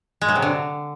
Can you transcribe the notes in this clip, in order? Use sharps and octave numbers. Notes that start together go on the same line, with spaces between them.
G#3
F#3
C3
D3